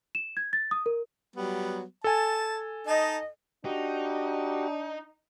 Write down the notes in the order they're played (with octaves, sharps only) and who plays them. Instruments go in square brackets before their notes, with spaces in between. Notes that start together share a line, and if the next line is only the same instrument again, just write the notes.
[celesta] E7
G#6
A6
D#6
A#4
[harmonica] F#3 G3 B3
[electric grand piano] A4 G#5 [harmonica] A5
[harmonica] D#4 A5 [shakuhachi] D#5
[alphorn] D4 [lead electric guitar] D#4 [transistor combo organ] F#4 G4